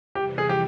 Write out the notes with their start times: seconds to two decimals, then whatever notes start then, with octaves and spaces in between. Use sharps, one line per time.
0.15 F2 C3 E3 G3 G4
0.38 G#4
0.49 G4